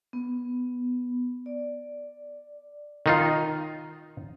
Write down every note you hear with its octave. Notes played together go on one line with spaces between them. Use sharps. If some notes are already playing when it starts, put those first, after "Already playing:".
B3
D5
D#3 D#4 F4